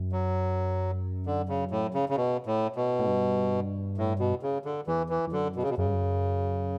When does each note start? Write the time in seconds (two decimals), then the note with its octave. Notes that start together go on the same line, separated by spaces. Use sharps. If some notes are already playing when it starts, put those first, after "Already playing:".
Already playing: F#2
0.12 F#3
1.26 D3
1.49 C#3
1.71 A2
1.94 C#3
2.09 C#3
2.16 B2
2.46 A2
2.76 B2
2.99 A2
3.07 G2
3.98 A2
4.19 B2
4.43 C#3
4.65 D3
4.87 E2 E3
5.09 E3
5.27 E2
5.32 F#2 D3
5.56 B2
5.63 C#3
5.69 B2
5.77 F#2 C#3
5.86 G2
5.94 F#2